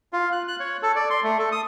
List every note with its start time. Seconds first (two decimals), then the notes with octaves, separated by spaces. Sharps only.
0.13 F4
0.32 F#6
0.48 F#6
0.60 C#5
0.83 A4
0.96 D5
1.10 C6
1.23 A3
1.39 A4
1.52 D#6